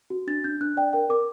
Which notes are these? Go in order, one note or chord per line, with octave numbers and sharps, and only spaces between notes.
F#4
D4 A6
D4 G6
D4 F#6
D5 G5
A#4 G5
A#4 D6